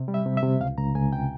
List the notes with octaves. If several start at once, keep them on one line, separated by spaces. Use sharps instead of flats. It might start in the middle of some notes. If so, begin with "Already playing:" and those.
Already playing: C3
G3
E5
C3
E5
C3
C#2 F5
C#2 A#5
C#2 G#5
C3 G5